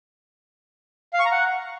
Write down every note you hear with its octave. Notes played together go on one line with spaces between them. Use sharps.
F5
C#6
A#5
F#5